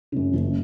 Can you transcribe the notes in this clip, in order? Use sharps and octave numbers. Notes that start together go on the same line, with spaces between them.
F#2 C#3
F#1